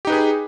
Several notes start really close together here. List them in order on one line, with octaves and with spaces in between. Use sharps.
G4 D#4 B4 G#4